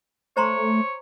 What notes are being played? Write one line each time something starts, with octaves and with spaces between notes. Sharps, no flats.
A3 C5 C#5 A#5 C6